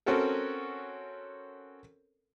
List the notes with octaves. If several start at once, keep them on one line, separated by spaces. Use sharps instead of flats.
C4 C#4 F#4 A4 A#4